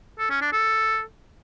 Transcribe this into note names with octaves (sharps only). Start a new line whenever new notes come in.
A4
C#4
D4
A4